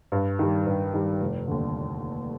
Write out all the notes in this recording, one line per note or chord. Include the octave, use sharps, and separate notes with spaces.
G2
D#3 G3
G2
D#3 G3
F1
D#2 D3